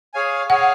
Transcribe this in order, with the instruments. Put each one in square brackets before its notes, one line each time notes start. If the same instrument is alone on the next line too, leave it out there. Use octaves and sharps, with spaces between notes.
[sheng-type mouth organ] G#4 C#5 F5 G#5
[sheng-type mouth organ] G#4 C#5 F5 G#5 [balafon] F#5